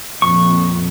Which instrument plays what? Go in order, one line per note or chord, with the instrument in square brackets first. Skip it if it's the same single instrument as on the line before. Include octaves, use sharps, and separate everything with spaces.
[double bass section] F2 A#2 [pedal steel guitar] C#6